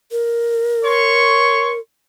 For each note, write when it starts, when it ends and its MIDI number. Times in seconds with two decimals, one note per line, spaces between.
0.12 1.79 70
0.84 1.73 73
0.84 1.73 84
0.84 1.73 85